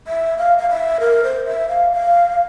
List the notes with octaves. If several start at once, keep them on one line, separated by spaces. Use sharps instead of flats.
E5
F5
F5
E5
A#4
C5
E5
F5
F5